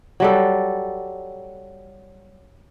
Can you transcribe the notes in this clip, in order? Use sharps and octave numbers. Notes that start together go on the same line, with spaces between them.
F#3 G3 A4